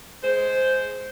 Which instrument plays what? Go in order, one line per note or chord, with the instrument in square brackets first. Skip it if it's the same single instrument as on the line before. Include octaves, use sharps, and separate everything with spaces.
[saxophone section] G#3 C5